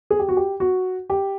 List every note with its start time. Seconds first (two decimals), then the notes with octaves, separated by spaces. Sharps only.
0.10 G#4
0.19 G4
0.29 F#4
0.37 G4
0.60 F#4
1.10 G4